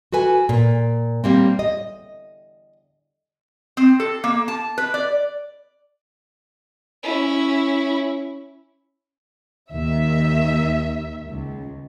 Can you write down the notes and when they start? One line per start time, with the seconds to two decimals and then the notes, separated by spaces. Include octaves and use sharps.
0.12 F#4 A4 B4 G#5
0.49 A#2
1.24 G3 A#3 C4
1.59 D#5
3.77 C4
4.00 A4
4.24 A#3
4.48 A5
4.78 B4
4.94 D5
7.03 C#4 E4
9.73 D#2 D#3 E5
11.29 C#2